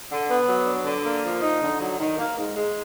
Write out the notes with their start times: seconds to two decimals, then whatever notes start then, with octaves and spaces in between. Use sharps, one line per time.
0.10 D3
0.29 B3
0.47 F#3
0.66 D4
0.84 D3
1.04 A#3
1.22 F3
1.42 D#4
1.61 D3
1.80 F#3
1.99 D#3
2.18 A#3
2.37 G#2
2.56 G#3